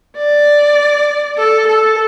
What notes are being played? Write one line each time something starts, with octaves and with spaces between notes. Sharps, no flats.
D5
A4
A4